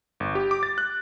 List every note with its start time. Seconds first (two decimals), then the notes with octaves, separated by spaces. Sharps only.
0.20 G1
0.35 G4
0.51 D6
0.63 A6
0.78 F#6